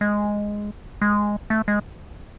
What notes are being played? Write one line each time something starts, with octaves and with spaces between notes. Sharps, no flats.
G#3
G#3
A3
G#3